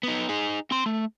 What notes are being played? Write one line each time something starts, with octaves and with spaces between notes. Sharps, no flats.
B3 D#4
D#4 G#4
C4 C6
A3